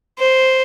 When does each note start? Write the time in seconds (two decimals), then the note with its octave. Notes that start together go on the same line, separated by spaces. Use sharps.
0.19 C5